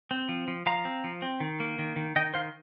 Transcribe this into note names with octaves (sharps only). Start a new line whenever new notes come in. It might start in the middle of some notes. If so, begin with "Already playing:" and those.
C4
F3
F3
F3 F5 A#5
C4
F3
C4
D#3
A#3
D#3
D#3
D#3 D#5 G5
D#3 C5 F5